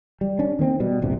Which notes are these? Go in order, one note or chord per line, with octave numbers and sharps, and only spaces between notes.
G3
C#4 D4
D#3 A#3 C4
B2 G3
D#1 A#1 G2 C3